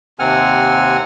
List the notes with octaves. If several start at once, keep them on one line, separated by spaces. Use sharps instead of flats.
D#2 C3 C4 F#5 G#5 F6